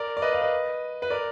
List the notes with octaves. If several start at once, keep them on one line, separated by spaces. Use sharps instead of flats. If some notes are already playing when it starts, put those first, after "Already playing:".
Already playing: A#4 D5
D5
B4 D#5
D5 F5
B4 D#5
B4
A#4 D5